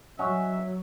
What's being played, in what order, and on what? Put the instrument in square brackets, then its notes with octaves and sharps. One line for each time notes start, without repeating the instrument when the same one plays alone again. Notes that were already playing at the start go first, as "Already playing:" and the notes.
[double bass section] F#3 [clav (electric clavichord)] C#4 D#5 F#5 [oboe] E5